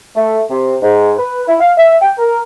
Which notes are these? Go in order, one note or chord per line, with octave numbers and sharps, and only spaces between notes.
A3
C3
G#2
B4
E4
F5
E5
G5
A#4